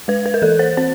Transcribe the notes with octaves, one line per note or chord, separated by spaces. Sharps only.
G#3 B4
B4
A#4
E3 A4
C5
C4 C5